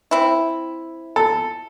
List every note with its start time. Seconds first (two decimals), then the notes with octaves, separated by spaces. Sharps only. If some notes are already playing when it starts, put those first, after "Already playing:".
0.11 C4 E4
1.16 A4